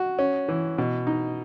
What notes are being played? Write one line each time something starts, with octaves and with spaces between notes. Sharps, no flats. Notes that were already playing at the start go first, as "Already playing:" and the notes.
Already playing: F#4
C#4
E3
B2
D#4